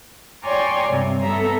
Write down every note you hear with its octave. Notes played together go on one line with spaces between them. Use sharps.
C#5 D5 G5 G#5 A#5 C6
G2 C3 G3
B3 A4 E5 A#5